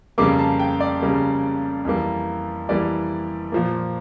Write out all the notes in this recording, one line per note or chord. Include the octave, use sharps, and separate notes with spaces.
F2 C#3 G3 A#3 D6
A5
G5
D5
F2 C#3 G3 A#3
F2 E3 G3 A#3
F2 E3 G3 A#3 D5
A#2 F3 A#3